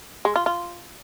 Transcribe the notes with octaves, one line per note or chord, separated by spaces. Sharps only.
G#3
F4
F4